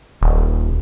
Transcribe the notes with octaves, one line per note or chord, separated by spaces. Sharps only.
D#1